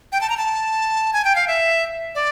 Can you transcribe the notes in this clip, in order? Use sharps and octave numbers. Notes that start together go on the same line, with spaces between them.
G5
A5
A#5
A5
G#5
G5
F5
E5
D5